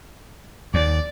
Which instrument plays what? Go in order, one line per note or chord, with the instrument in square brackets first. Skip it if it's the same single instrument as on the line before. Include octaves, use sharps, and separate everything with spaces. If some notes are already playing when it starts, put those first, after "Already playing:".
[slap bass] D#2 [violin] D5